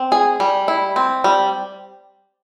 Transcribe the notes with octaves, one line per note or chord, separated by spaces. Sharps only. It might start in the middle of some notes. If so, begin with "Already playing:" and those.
Already playing: C4
G#4
G3
E4
C4
G3